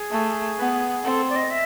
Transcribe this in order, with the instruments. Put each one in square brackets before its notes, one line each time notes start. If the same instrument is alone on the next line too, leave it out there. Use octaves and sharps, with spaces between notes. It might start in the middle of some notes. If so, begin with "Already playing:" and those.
Already playing: [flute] G#4
[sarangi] A3
B3
[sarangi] C4 [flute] A4
[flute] D5
D#5
E5